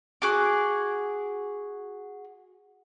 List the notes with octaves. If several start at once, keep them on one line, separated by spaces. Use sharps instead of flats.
F#4 G#4 D6